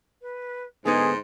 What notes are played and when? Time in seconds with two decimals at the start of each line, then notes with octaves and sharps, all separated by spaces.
0.21 B4
0.85 G#2 D3 B3 D#4 G#4 C6